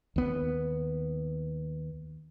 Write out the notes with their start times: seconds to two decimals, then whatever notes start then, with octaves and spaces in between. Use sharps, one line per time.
0.16 D#2 B3